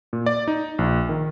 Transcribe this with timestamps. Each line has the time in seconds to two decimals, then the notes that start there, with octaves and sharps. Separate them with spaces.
0.13 A#2
0.26 D5
0.48 D#4
0.79 A#1
1.09 D#3